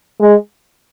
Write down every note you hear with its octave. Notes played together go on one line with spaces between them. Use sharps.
G#3